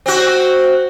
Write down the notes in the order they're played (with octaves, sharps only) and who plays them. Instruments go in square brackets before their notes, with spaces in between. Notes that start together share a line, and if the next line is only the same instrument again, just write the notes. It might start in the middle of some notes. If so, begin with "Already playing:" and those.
[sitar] C4 F#4